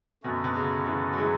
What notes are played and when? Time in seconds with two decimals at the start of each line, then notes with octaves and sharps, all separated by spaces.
0.23 F#2 B2 D3 A3 C#4 F#4
0.44 B2
0.55 C#3
0.86 C#3 E3
1.13 F#3
1.17 E3 G#3